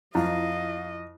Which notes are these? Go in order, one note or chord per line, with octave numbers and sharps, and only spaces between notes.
F2 E4 D#5 F5